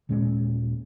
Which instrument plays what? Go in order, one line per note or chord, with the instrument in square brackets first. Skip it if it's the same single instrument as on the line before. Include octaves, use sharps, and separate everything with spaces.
[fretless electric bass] D#1 A#2 G#3 C#4